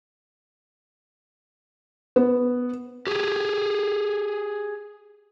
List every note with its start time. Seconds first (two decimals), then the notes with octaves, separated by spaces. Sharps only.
2.16 B3
3.07 G4 G#4